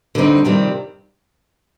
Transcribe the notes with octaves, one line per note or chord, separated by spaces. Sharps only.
D3 G3 C4 D#4
F2 C3 D#3 G3 C4